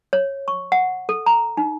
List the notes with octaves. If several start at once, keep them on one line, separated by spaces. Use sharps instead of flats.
C#5
C#6
F#5
A4
A#5
D#4